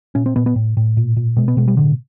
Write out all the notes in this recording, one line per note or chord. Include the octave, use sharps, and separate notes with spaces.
A#2 C#4
C4
A#2 B3
B3
A2
A2
A#2
A#2
B2 G#3
B3
B2 G#3
G3
A2 D3